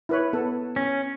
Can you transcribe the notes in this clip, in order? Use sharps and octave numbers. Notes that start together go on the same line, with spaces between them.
E4 B4 C#5
B3 A4
C#4